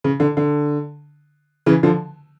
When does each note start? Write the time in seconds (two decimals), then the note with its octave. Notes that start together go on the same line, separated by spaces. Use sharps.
0.04 C#3
0.20 D3
0.37 D3
1.66 C#3 E3
1.83 D3 F3